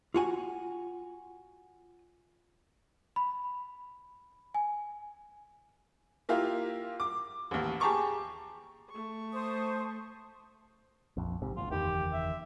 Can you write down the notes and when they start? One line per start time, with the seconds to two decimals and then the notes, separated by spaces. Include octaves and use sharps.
0.14 F4 F#4 G#5
3.16 B5
4.55 G#5
6.29 A#3 E4 F4 G4 A#4 F5
7.00 D6
7.51 A1 D#2
7.80 G4 G#4 A5 A#5 C#6 D6
8.90 A3 C#6
9.33 C5 A5 D#6
11.17 A#1 F2
11.42 A#1 G#2 C3
11.57 G1 D2 F4
11.72 F#1 E2 D#3 G4
12.13 E5